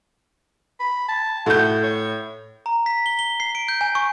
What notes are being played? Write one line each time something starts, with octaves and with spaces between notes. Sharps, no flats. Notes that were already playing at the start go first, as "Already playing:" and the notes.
B5
A5
A2 F#4 G6
C#5
A#5
B6
G7
G7
C7
D7
G6
G#5
C#6